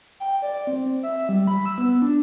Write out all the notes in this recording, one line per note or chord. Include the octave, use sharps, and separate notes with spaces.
G5
D5
C4
E5
G3
B5
E6
B3
D4